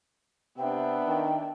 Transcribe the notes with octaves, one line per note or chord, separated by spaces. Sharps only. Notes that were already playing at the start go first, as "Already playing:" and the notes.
C3 B3 D4 E5 G5
D#3